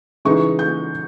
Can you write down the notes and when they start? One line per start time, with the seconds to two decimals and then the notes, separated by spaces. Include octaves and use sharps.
0.25 C#3 E3 G#3 D#4 C#6
0.59 G6